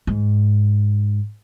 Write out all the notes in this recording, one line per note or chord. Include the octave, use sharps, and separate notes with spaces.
G#2